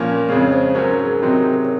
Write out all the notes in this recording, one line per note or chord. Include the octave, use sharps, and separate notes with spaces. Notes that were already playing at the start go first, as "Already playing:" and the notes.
Already playing: A#2 F3 A#3 C#4
F2 C#3 G#3 C#5
C5
G#2 F#3 C#4 A#4
A#4
G#4
C3 D#3 F#3 C4 D#4 F#4
F#4
G#4
A#4
C#5